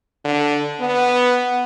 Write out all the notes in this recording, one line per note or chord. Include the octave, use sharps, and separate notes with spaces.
D3
B3